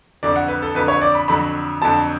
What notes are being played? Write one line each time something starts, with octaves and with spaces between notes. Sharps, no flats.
F2 D3 F#3 D5
F#5
B4
A4
F2 D3 F#3 B4
C#5
D5
B5
F2 D3 F#3 B5
F2 D3 F#3 A5